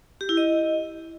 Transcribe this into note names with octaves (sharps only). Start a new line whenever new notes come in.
G4
E4
D#5